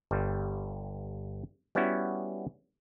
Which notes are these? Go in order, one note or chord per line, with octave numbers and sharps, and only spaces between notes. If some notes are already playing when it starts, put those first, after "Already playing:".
G1 G2 G3
G3 B3 C#4 E4 F#4